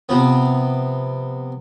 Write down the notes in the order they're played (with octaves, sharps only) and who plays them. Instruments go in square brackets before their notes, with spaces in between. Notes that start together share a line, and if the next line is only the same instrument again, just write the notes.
[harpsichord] C3 F3 B3